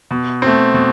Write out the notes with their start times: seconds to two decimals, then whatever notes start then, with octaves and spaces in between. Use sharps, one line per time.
0.11 B2
0.42 A3 C4
0.74 B2